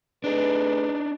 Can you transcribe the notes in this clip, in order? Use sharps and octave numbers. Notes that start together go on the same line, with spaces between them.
A3 D4 D#4 G#4 B4